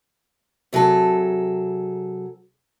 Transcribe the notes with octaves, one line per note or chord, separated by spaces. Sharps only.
C3 F#3 G#4 A4